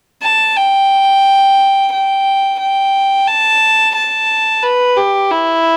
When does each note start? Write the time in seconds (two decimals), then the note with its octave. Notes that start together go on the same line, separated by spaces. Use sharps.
0.22 A5
0.56 G5
1.92 G5
2.60 G5
3.27 A5
3.95 A5
4.63 B4
4.97 G4
5.31 E4